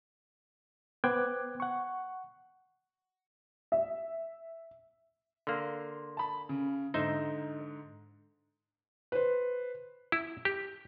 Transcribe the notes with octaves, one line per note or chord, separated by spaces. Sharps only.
B3 C5 G5 D6 F#6 G#6
F#5 C#6
E5
D3 A#3 C6
A5 B5
C#3
G#2 D3 D#4 C5 E5
B4 C5
E4
G4